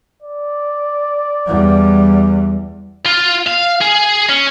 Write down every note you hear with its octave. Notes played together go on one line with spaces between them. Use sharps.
D5
E2 G3
F4
F5
G#4
C#4